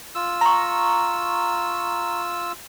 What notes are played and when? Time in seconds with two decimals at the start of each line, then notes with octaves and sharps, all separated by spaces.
0.15 F4 E6
0.41 A#5 C#6